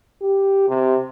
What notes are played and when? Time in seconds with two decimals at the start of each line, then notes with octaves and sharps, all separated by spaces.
0.22 G4
0.68 C3